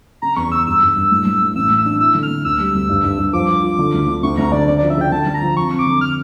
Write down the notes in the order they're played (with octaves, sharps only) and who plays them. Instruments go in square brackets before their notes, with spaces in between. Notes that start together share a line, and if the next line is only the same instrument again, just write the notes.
[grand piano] C#3 [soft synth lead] A#5
[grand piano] E2 [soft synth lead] C#6
[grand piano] C#3 [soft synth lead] E6
[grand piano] G2 [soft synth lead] E6
[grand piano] G2
G2
A2
A2
A2
[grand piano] A1 [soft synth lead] E6
[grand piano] A2
[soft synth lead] E6
[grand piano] D4
[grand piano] E4 [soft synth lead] E6
[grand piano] D3
[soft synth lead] F6
[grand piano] A3
[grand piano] D2 [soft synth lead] E6
[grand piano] G3
D2
G2
G2
G2
[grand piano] F3 [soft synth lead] D6
[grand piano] F3
F4
D3
D2
D3
[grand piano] D2 [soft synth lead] C#6
[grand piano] D2 [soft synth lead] A#5
[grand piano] D3 [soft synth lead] D5
[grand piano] C#3 [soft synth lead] D5
[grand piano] F3 [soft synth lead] D5
[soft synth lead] E5
[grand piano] C#3 [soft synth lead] G5
[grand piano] D3 [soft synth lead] A5
[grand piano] D3
[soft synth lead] A#5
[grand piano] F3
[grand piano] F2 [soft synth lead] C#6
[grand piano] F2
[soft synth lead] D6
[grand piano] D3
[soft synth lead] F6